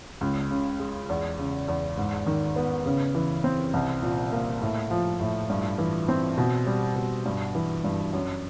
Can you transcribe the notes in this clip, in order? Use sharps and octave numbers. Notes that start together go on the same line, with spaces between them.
C#2
C#3
G#3
E2
C#3
E2
G#2
D#3
B3
C#3
E3
C4
C2
A#2
A#3
A2
F3
A2
G2
E3
C4
B2
G3
B2
G2
E3
G2
F#2